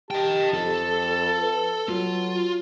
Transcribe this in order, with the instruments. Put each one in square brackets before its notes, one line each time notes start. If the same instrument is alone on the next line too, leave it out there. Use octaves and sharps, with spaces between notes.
[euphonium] G4 [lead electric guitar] D#5 G5 [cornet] A5
[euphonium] F2 [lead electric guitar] A4
[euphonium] B4
[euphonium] F#3 [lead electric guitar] F4